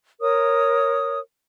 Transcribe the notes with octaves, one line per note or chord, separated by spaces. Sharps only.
A#4 C#5 D#6